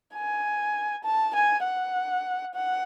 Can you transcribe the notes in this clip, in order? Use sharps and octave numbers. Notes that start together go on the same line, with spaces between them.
G#5
A5
G#5
F#5
F#5